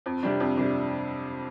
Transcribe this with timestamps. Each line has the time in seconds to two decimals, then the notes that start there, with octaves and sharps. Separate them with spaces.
0.06 F2
0.23 C3 G3 D4
0.40 F2
0.57 C3 G3 D4